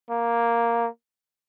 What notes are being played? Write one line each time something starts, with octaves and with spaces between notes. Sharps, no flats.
A#3